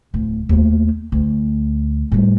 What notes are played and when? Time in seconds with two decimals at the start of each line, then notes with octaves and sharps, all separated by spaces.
0.14 D1
0.49 D#2 A3
1.12 D2
2.12 A2 G3